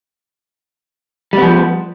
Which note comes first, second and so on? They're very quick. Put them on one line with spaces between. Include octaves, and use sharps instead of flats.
G3 B3 F3